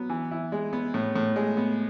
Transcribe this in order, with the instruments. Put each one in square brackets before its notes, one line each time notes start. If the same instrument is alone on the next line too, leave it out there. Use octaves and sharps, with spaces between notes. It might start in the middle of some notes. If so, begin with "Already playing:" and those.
Already playing: [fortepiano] F#3 B3
E3
E4
G#3
B3
A2
A2
G#3
B3